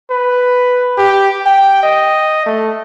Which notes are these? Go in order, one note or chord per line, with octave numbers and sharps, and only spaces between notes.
B4
G4
G5
D#5
A3